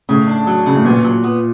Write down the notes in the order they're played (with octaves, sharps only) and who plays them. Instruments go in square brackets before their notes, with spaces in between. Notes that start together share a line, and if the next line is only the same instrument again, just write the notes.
[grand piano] A2 [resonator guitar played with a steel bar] C#3
[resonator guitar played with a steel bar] D4
F#3
C#3
[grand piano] A2
[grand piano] A#2 [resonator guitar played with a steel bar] B3
[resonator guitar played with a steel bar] F#3
B3